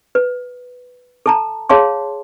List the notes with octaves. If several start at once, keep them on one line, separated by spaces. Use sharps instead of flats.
B4
A4 A5 A#5
G#4 C#5 F5 A5 C6